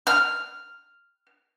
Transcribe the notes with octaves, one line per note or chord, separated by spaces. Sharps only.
F6